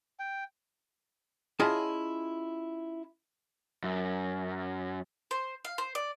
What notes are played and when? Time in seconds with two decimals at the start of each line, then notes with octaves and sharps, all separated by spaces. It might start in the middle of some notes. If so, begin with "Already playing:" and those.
0.19 G5
1.60 C#4 E4 F4 G#4 D#5 A5
3.84 F#2
5.31 C5
5.65 F5
5.78 C5
5.95 D5